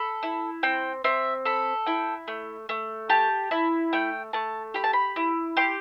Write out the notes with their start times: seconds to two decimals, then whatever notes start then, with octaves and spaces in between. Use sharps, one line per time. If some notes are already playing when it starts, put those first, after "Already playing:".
Already playing: A4 B5
0.23 E4
0.63 C4 G5
1.04 C4 E5
1.45 A4 B5
1.86 E4 G5
2.28 A3
2.69 A3
3.09 G4 A5
3.51 E4
3.93 A3 G5
4.33 A3 A5
4.74 G4 B5
4.84 A5
4.93 B5
5.16 E4
5.57 G4 C6